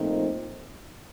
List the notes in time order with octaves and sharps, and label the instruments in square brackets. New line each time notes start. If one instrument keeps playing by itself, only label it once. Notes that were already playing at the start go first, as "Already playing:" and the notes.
Already playing: [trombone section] A#2 F3 A3 C4 D#4